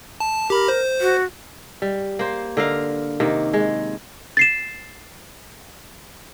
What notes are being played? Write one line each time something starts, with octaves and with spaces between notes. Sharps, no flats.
A5
G4 A#4 B5
C5
F#4
G3
A#3 C5
D3 A#4 F5
C3 D#3 A#3
G#3
A6 C7 E7